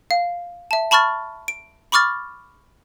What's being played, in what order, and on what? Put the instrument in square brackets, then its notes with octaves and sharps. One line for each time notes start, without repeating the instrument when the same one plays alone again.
[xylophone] F5
E5 A5
A5 B5 C#6 F6 A6
D7
B5 C#6 D6 F6 A6